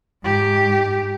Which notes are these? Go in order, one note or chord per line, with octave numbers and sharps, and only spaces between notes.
G#2 G4